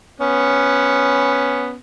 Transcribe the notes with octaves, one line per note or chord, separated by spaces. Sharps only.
B3 C#4